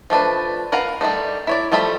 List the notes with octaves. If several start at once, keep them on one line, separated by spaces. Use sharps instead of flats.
F3 A3 D4 B4
A#4 B4 F5 F#5 A#5
G3 A3 D4 D#4
E4 C#5 D5
F3 G3 A3 A4 B5